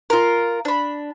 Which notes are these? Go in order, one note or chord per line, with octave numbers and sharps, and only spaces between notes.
F4 A#4
D4 B5